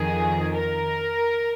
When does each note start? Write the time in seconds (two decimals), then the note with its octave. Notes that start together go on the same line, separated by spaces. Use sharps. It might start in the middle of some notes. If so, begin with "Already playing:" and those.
Already playing: F2 D#3 G#4
0.54 A#4